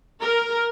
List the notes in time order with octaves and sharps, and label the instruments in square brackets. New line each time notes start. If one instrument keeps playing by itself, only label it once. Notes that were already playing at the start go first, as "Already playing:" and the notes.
[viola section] A#4